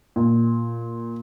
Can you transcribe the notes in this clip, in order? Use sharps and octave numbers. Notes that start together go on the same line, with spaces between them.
A#2